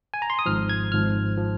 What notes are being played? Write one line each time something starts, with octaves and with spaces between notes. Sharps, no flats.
G#5
A#5
C6
D#6
G#1 G#2 F3 F6
G#6
G#1 G#2 F3 F6
F3